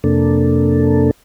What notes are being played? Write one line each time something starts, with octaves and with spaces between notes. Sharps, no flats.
F2 C3 A#3 D4 A4